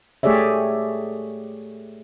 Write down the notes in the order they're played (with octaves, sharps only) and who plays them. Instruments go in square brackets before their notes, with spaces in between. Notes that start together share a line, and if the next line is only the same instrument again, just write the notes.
[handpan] A3 G4 G#4 C#5 D5 E5